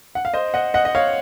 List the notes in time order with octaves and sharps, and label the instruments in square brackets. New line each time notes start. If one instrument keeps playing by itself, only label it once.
[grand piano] F#5
F5
C5 D#5
D#5 F#5
D#5 F#5
D#5
C#5 F5